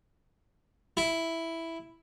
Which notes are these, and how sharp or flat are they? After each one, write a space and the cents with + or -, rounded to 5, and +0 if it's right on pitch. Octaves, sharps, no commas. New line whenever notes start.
E4 +0